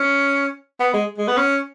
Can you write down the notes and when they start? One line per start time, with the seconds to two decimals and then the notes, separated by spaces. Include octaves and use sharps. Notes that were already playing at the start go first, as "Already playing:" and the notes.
Already playing: C#4
0.80 B3
0.94 G#3
1.18 G#3
1.28 B3
1.37 C#4